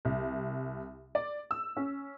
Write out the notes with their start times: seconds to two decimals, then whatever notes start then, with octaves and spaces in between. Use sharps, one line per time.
0.05 C2
1.15 D5
1.51 E6
1.77 C#4